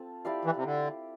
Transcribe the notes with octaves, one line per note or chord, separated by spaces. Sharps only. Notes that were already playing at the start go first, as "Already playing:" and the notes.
Already playing: C4 F4 A4
E4 G4 D5 F5
E3
C3
D3